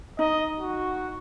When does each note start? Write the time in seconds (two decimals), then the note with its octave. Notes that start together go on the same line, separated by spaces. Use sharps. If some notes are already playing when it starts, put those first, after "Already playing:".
0.19 D#4 D#5
0.59 F#4